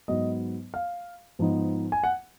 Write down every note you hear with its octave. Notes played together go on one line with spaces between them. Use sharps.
G#2 F#3 B3 D#5
F5
G#2 F3 B3 D#4
G#5
F#5